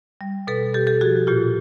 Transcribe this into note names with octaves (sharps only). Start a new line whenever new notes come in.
G3
B2 A4 B4
B2 G4 A4
G4 A4
F3 F#4 G#4
A#2 F4 G4